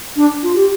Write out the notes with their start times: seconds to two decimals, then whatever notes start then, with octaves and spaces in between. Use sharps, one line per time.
0.16 D4
0.43 F4
0.55 G4